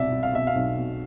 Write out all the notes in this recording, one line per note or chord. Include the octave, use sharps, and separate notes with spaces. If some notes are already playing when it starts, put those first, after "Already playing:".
Already playing: C2 B2 D5 E5
C2
F5
B2 E5
F5
B1
B2